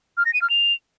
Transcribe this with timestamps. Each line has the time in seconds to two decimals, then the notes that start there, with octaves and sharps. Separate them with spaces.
0.17 F6
0.25 A#6
0.33 D#7
0.42 F6
0.50 F7